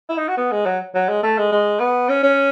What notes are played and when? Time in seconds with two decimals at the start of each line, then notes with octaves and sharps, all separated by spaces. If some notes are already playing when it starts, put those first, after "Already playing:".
0.09 E4
0.18 D#4
0.28 F#4
0.37 B3
0.52 G#3
0.66 F#3
0.95 F#3
1.09 G#3
1.23 A3
1.38 G#3
1.52 G#3
1.80 B3
2.09 C#4
2.23 C#4